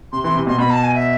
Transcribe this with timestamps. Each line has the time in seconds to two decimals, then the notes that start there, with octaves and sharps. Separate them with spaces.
0.12 C3 C6
0.23 E3 C6
0.35 C3
0.47 B2 C6
0.58 B2 B5
0.70 A5
0.83 G#5
0.94 E5